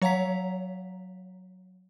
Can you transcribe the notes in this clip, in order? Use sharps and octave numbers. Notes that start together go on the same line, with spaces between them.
F#3 C#5 F5 F#5 A#5 B6